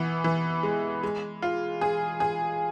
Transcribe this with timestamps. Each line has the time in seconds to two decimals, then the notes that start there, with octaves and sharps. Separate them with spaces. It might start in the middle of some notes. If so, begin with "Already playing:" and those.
Already playing: E3 B3
0.24 E3
0.63 G#3
1.03 G#3
1.42 F4
1.81 G#4
2.20 G#4